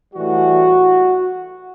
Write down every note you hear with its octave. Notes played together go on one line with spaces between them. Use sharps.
A2 E3 G3 F#4